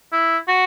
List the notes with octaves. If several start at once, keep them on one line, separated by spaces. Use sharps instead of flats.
E4
F#4